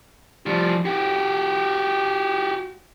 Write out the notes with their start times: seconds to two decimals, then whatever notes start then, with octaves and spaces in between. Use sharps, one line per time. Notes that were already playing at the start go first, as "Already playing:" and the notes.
0.46 F3 G3
0.85 F#4 G4